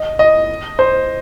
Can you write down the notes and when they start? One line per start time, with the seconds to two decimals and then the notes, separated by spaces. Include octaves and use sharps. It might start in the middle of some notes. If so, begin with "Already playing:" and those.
Already playing: D#5
0.19 D#5
0.79 C5